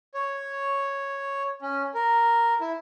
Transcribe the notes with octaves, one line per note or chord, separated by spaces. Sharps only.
C#5
C#4
A#4
E4